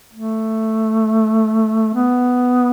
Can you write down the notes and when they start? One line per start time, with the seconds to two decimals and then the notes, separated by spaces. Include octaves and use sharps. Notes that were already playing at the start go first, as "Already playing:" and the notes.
0.13 A3
1.94 B3